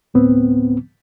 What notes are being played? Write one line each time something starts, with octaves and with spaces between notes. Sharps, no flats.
D2 A2 B3 C4